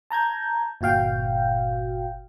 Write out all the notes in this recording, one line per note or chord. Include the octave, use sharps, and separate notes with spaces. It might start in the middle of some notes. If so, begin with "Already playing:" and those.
A5 A#5 G6 G#6
G1 A#2 F#4 F5 G5